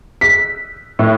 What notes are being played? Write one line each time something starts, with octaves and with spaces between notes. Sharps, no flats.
B6
A2